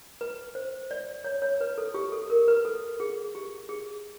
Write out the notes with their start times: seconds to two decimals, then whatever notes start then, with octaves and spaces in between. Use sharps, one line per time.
0.21 B4
0.55 C5
0.91 D5
1.24 C#5
1.42 C#5
1.61 B4
1.78 A4
1.94 G4
2.12 A4
2.30 A#4
2.48 B4
2.65 A4
3.00 G#4
3.35 G4
3.69 G#4